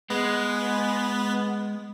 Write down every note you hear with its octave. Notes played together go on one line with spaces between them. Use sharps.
G#3 B3